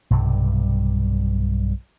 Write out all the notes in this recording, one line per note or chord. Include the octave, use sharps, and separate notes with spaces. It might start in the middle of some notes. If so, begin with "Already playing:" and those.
B1 G2 C3 G3